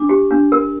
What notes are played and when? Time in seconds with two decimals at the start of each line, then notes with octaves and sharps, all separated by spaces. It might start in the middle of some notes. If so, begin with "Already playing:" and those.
Already playing: D4 D6
0.09 G4
0.31 D4
0.52 A#4